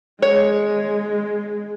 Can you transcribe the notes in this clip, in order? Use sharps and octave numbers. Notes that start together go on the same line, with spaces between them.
G#3 C#5